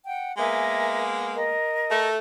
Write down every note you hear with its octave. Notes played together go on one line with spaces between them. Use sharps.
F#5 G5
G#3 A#3 B3 A#4 E5 G#5
A#4 D#5
A3